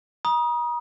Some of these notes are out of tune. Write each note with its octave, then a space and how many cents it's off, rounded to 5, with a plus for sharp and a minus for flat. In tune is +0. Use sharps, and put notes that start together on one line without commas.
A#5 +40 D#6 +0